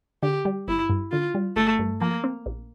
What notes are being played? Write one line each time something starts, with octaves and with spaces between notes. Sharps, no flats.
D3 G4
G3
G1 E4
G2
D3 F4
G3
G1 A3
G2
F3 A#3
C4
A#1